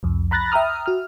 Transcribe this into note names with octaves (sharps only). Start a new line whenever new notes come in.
C2 F2
A#5 B5 F#6 A6 A#6
E5 G5 A#5 D#6 F6
F#4 F6